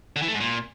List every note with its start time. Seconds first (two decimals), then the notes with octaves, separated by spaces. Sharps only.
0.16 D3
0.22 E3
0.28 A3
0.34 G#2
0.40 A#2